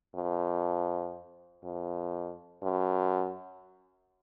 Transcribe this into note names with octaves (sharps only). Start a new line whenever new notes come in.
F2
F2
F#2